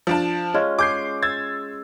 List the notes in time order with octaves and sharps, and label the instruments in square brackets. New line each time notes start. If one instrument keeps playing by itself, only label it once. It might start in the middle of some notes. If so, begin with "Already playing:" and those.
[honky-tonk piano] F3 D4 A5
[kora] G#3 C#4 F4
[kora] G#4 [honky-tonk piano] D6 G6 C7
[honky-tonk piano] E6 G#6 A6